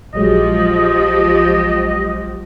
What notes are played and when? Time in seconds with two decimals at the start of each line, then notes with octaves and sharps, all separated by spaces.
0.14 A#1 F3 F#3 G#3 G4 D#5